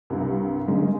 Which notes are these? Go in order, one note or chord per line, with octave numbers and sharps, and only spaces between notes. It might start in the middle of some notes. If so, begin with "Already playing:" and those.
C2 G2
D3 G#3 A#3 C#4